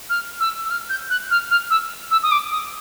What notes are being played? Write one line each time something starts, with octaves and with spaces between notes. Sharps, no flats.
F6
E6
E6
F6
G6
F#6
F6
F6
E6
E6
D#6
D6
D#6